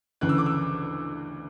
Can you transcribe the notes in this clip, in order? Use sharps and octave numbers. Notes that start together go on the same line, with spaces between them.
D2 C#3 E3 F#6
E6
D6
E6